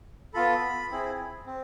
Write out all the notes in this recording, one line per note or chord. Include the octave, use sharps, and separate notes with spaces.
B3 F4 A4 B5
C4 E4 G#4
C4